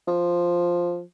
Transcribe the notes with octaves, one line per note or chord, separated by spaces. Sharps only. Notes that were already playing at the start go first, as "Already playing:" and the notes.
F3